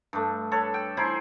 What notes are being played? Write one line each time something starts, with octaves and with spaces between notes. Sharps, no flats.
G2 A3
A4 B4 C#5
G5
D#4 E4 G#4 C5